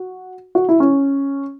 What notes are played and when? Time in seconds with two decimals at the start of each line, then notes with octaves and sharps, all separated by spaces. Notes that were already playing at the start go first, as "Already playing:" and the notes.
Already playing: F#4
0.55 F#4
0.69 E4
0.80 C#4